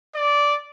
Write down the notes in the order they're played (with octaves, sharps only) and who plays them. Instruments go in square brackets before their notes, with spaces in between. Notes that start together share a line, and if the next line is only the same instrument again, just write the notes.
[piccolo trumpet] D5